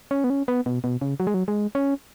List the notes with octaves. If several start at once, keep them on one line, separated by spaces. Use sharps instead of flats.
C#4
B3
C#4
B3
B2
B2
C#3
F#3
G#3
F#3
G#3
C#4